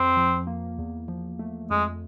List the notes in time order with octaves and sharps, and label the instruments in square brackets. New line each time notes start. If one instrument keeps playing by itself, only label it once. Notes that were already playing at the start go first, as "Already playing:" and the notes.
Already playing: [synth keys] F2 [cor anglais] C4
[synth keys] F3
A#3
E2
F3
A3
[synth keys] F2 [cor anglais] G#3